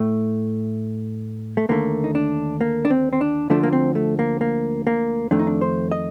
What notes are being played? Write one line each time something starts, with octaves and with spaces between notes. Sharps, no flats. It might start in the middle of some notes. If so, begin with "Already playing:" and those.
Already playing: A2 A3
A3
D#2 D3 A3 A#3
D#4
D4
A#3
D4
C4
C4
D4
D2 D3 F3 A3 D4
A#3
C4
A3
A#3
A#3
A#3
F2 D#3 A3 D4
D#4
D4
C5
D#5